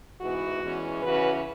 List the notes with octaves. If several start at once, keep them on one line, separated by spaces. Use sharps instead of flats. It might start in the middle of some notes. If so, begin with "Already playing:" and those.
G#2 E3 B3 F#4
E2 E3 G#3 C#4
C#3 E3 C#4 F#4 B4